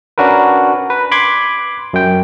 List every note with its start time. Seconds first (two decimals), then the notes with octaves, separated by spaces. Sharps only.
0.18 C#4 D4 F#4 A#4 B4
0.90 B4
1.12 B5 C6 D6 G#6
1.93 F#2 G5